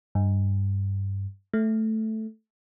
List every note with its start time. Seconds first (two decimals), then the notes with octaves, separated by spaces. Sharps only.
0.15 G2
1.53 A3